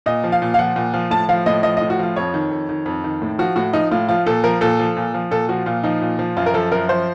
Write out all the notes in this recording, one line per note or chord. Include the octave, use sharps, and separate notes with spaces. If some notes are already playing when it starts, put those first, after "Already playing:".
A#2 D#5
F3
F5
A#2
F5
F3 F#5
A#2
F3
A2 A5
F3 F5
A2 D#5
F3 D#5
D#5
A2
F#4
F3 F4
F2 C#5
D#3
F2
D#3
F2
D#3
A2
F3 F#4
A2 F#4
F3 D#4
A2 F4
F3 F4
A#2 A4
F3 A#4
A#2 A4
F3
A#2
F3
A#2 A4
F3 F#4
A#2 F4
F3 D#4
A#2
F3
F#2 F4
A#4
F3 A4
F#2 A#4
F3 C5